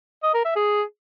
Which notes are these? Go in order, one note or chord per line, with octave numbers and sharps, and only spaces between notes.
D#5
A#4
E5
G#4